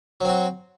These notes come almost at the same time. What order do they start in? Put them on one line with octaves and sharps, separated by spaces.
F#3 C4 F#4